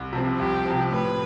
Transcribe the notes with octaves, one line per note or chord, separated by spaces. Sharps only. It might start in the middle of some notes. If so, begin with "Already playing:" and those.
Already playing: C2
C3 F3 C4
C2 G4
C3 F3 C4
A2 B4